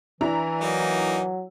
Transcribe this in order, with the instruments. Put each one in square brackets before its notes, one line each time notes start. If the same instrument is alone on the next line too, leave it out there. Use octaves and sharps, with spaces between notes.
[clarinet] E3 [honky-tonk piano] D4 E4 A#5
[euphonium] F#3 [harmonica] A#3 D#4